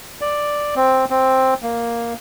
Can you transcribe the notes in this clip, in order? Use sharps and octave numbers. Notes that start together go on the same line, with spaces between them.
D5
C4
C4
A#3